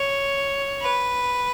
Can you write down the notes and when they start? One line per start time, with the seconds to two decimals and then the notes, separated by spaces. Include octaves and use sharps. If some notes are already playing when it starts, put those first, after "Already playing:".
Already playing: C#5
0.82 B4